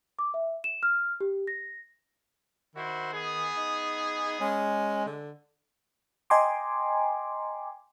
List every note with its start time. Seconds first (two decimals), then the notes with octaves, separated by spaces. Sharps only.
0.19 D6
0.34 E5
0.64 E7
0.83 F6
1.21 G4
1.47 A#6
2.75 D#3 E4 F#4 C5
3.12 B3 G#4
3.57 D#4
4.40 G#3 C#4
5.06 D3
6.30 D#5 G5 G#5 A#5 C6 D6